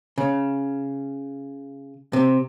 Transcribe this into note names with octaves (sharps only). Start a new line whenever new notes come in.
C#3
C3